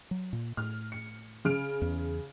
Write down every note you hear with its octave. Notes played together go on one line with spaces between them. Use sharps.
F#3
A#2
A2 F6
C#7
C#3 F6 D7
E2